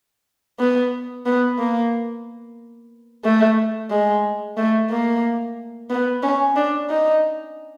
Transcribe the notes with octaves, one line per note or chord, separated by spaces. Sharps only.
B3
B3
A#3
A3
G#3
A3
A#3
B3
C#4
D4
D#4